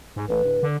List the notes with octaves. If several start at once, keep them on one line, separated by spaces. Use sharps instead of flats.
G#2
A1 B4
D1
D3